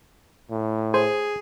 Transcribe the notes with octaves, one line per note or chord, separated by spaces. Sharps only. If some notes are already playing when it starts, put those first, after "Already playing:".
A2
G#4 C5